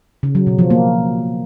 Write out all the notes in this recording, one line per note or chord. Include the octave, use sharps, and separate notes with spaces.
C#3
F#3
B2
F3
A#3